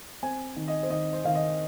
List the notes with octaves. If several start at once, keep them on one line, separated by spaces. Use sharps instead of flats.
C4 G#5
D#3
D#5
C5
D#3 D#5
C5
D#3 F5
D#5